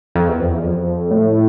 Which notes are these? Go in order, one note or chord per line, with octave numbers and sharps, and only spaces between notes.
F2
E2
F2
E2
F2
A2